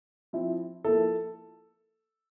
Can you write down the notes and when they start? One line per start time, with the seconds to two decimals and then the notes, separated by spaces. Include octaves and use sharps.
0.33 F3 C4 E4
0.84 F3 A#3 E4 A4